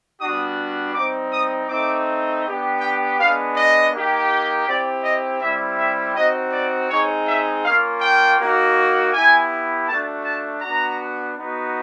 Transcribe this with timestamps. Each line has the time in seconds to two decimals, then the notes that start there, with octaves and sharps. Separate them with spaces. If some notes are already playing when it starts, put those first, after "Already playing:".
0.20 G3 B3 D4 F#4 D#6
0.94 G3 C4 D#4 D6
1.32 D#6
1.69 A3 C4 D#4 D6
2.44 B3 D4 G4
2.80 G5
3.17 G#3 B3 D4 F5
3.55 D#5
3.92 A#3 D#4 G4
4.66 C4 E4 G4 D5
5.03 D#5
5.40 G3 C4 E4 G4 E5
5.78 E5
6.15 C4 D#4 F#4 D#5
6.52 D5
6.90 G#3 C4 D#4 C#5
7.27 E5
7.64 A#3 C#4 F4 F5
8.01 G5
8.38 A#3 D#4 F#4
9.12 B3 E4 G4 G#5
9.87 A3 D4 F#4 A5
10.24 A5
10.61 B3 D4 F#4 A#5
11.35 B3 D#4 F#4